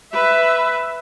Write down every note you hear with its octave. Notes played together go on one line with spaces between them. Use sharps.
B4 E5